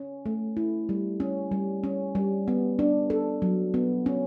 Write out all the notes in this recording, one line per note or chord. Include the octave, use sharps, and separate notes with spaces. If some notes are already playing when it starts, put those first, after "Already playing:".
Already playing: C#4
A3
E4
G3
C#4
G3
C#4
G3
B3
D4
A4
F#3
B3
C#4